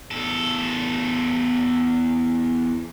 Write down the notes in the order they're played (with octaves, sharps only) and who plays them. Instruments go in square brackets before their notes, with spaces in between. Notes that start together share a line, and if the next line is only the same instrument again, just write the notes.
[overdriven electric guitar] E2 A4